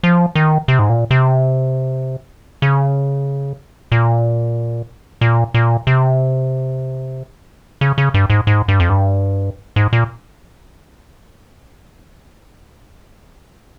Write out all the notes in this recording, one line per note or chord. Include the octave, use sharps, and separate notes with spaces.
F3
D#3
C3
G#2
A#2
C3
C#3
A#2
A#2
A#2
C3
C#3
C#3
G2
G#2
G#2
G2
F2
G2
G#2
A#2